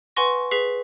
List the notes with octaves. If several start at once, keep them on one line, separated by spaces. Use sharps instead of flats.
B4 F#5 G#5 C6 C#6 A#6
G#4 B4 B6 C7 F7